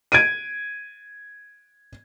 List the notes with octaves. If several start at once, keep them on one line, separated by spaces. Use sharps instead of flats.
G#6 D7 D#7